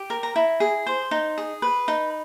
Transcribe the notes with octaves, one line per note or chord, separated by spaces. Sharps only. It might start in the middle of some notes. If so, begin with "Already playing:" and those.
Already playing: G4
A#4
A#5
E4
G#4
C5
D#4
G#4
B4
D#4